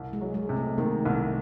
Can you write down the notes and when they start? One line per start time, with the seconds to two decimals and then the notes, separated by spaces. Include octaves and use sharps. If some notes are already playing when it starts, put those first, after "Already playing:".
Already playing: C2
0.13 G#3
0.21 F#3
0.34 G#3
0.49 C3
0.57 A3
0.78 D#3 G#3 A#3
1.06 C2